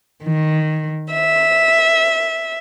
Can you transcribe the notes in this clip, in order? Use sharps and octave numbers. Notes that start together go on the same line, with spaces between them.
D#3
E5